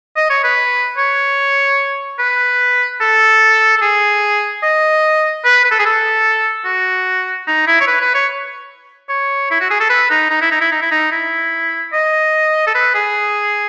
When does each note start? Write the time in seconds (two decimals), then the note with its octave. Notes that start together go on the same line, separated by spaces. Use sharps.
0.17 D#5
0.30 C#5
0.44 B4
0.98 C#5
2.19 B4
3.01 A4
3.77 A4
3.81 G#4
4.63 D#5
5.45 B4
5.64 B4
5.71 A4
5.79 G#4
5.86 A4
6.65 F#4
7.47 D#4
7.67 E4
7.81 C#5
7.87 B4
8.01 B4
8.15 C#5
9.09 C#5
9.51 E4
9.61 F#4
9.70 G#4
9.80 A4
9.90 B4
10.10 D#4
10.30 D#4
10.41 E4
10.51 D#4
10.61 E4
10.72 D#4
10.82 E4
10.92 D#4
11.12 E4
11.93 D#5
12.67 A4
12.75 B4
12.95 G#4